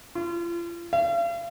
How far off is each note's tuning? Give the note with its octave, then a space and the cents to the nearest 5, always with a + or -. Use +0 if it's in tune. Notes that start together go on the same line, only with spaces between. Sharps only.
F4 -35
F5 -40